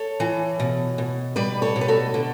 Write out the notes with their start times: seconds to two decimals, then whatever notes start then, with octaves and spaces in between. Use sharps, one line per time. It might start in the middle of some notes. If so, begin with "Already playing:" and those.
Already playing: A4 C#5
0.20 E3
0.60 B2
0.98 B2
1.36 G3 B4 D5
1.62 A4 C#5
1.76 B2
1.81 B4
1.88 F#4 A4
2.14 D3